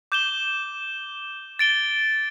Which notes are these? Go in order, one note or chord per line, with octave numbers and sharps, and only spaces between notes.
D6 G6 E7 G7
A6 D7 G7